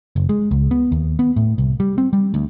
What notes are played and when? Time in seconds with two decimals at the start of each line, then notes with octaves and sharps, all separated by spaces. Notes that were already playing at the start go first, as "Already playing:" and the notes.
0.16 F#1
0.29 G#3
0.51 C#2
0.71 B3
0.92 D#2
1.19 B3
1.36 A2
1.58 C2
1.80 G3
1.98 C4
2.13 G3
2.34 D2